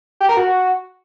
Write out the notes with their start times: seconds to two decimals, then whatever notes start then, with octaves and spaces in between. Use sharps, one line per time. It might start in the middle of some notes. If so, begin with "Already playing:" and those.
0.20 G4
0.29 A#4
0.37 F#4